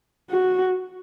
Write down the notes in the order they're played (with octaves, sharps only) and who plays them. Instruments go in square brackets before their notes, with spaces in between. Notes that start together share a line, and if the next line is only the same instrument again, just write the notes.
[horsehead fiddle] F#4